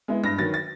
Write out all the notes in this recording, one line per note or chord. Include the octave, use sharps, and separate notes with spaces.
G#3 B3 E4
G2 A#6
D#3 F#3 A6
A6